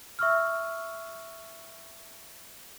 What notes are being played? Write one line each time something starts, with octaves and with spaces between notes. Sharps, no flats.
E5 C#6 E6 F6